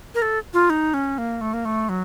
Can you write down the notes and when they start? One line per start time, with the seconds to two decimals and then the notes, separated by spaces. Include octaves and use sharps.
0.15 A#4
0.22 A4
0.53 F4
0.70 D#4
0.94 C#4
1.18 A#3
1.41 A3
1.54 A#3
1.65 A3
1.89 F#3